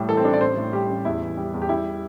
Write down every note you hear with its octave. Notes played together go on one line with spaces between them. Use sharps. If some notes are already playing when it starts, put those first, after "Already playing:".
Already playing: A2 G3
E3 A4
C4
A1 D4
D5
A1 C5
A2
G3 G4
A1
E2 E4
E3
G3
E2
G4
G3 E4